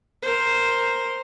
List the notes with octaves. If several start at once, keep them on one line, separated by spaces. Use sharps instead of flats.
A#4 C5